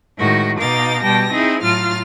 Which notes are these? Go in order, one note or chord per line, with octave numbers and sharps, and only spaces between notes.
A2 D#3 G#3 F#4
B2 D#4 F5 D6 A6
B2 G3 G5 A5 A#6
C4 D#4 E4 G#4
A2 F#3 F4 F6 A6